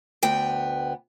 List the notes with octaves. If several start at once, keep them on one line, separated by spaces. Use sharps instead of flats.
D2 B3 G5